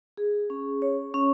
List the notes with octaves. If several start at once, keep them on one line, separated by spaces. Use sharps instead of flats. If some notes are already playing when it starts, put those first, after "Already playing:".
G#4
C#4
C#5
C#4